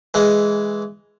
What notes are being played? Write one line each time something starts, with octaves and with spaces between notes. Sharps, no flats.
E3 G#3